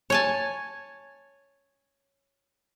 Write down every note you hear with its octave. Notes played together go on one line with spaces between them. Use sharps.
C#5 G#5 A5